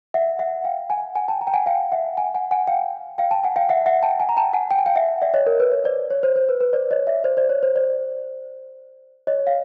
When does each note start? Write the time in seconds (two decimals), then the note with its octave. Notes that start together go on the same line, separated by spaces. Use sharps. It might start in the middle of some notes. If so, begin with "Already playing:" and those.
0.14 E5 F#5
0.39 E5 F#5
0.64 F5 G5
0.90 F#5 G#5
1.15 F#5 G#5
1.28 G5 A5
1.41 G#5 A#5
1.47 G5
1.53 F#5 G#5
1.66 F5 G5
1.92 E5 F#5
2.17 F#5 G#5
2.34 F#5 G#5
2.51 F#5 G#5
2.67 F5 G5
3.18 F5 G5
3.31 G5 A5
3.44 F#5 G#5
3.56 F5 G5
3.69 E5 F#5
3.86 E5 F#5
4.03 G5 A5
4.20 F#5 G#5
4.29 A#5
4.37 G5 A5
4.53 F#5 G#5
4.71 G5
4.78 G#5
4.86 F5 G5
4.95 E5 F#5
5.22 D5 E5
5.34 C#5 D#5
5.46 A#4
5.60 B4
5.72 C#5
5.84 C5 D5
6.10 C#5
6.23 C5
6.36 C5
6.49 B4
6.60 B4
6.73 C5 D5
6.91 C#5 D#5
7.07 D5 E5
7.24 C5 D5
7.37 C5 D5
7.49 C#5
7.63 C5
7.76 C5 D5
9.27 C#5 D#5
9.47 F5